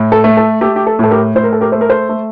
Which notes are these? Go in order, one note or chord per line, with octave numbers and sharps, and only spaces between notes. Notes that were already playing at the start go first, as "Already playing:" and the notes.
Already playing: A2
A4
A3
A4
A3 G4
G4
A4
A2 A4
G4 A#4
A2 C5
A#4
A4
G4 A#4
A3 C5
A#4
A4 C5
A3